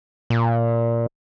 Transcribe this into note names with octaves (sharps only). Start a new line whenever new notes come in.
A#2